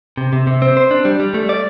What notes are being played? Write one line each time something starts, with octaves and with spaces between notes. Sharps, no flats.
C3
C3
C3
C4
C5
D4
G3
G3
A3
D5